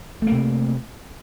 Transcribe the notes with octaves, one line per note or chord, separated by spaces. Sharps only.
C3 A3 A#3